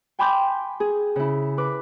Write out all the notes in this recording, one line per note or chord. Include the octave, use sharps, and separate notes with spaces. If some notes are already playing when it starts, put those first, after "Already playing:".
G5 G#5 B5 C6 D6 G6
G#4
C#3 E4
B4 D6